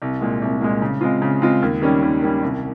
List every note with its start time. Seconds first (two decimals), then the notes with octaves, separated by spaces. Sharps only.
0.02 C2
0.21 A#2 G#3
0.42 C2
0.61 A#2 G#3
0.82 C#3
1.01 G#3 C4 F4
1.22 C#3
1.42 G#3 C4 F4
1.62 D#2
1.82 D#3 G3 C#4
2.02 D#2
2.23 D#3 G3 C#4
2.42 C2